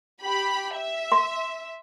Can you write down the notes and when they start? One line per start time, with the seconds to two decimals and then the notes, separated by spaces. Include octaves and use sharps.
0.22 G4 B5
0.74 E5
1.12 C6